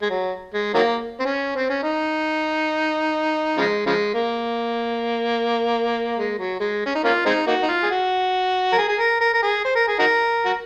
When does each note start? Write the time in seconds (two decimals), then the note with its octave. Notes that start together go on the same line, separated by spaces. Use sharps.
0.02 G#3
0.10 F#3
0.54 G#3
0.74 D#3 F#3 A#3
1.20 C4
1.25 C#4
1.56 C4
1.70 C#4
1.83 D#4
3.57 C#3 F3 G#3
3.86 C#3 F3 G#3
4.14 A#3
6.18 G#3
6.39 F#3
6.60 G#3
6.86 C#4
6.95 D#4
7.04 A#3 C#4 F4
7.26 G#3 C4 D#4
7.47 A#3 D#4 F#4
7.63 D#4
7.68 F4
7.83 G#4
7.91 F#4
8.72 A#4
8.78 G#4
8.89 G#4
8.99 A#4
9.21 A#4
9.34 A#4
9.43 G#4
9.65 C5
9.75 A#4
9.88 G#4
9.99 D#4 F#4 A#4
10.45 F#4